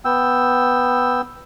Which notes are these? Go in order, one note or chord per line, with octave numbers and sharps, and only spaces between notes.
B3 G5 E6